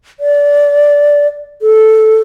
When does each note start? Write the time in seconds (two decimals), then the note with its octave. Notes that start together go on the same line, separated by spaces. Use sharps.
0.20 D5
1.62 A4